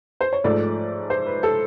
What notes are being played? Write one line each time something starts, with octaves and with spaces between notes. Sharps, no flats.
C5
C#5
G#2 F3 A3 D5
C5
B4
A4